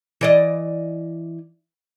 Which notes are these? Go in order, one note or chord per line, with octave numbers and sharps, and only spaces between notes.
E3 D5 D#5